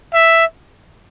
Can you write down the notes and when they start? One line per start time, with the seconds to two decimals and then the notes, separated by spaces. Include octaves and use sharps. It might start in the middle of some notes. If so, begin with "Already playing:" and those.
0.14 E5